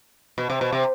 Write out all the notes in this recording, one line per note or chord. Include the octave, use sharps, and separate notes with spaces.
B2
C3
B2
C3